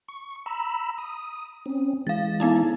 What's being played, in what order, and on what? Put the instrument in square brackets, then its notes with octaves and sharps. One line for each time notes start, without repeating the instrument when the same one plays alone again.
[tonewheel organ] C#6
A#5 B5 E6
D#6
C4 C#4
[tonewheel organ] E3 G#3 [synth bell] F5 A6
[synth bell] B3 D#4 E4